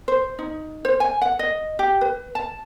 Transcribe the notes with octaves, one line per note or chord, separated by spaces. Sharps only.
C5
D#4
C5
G#5
F#5
D#5
G4
B4
A5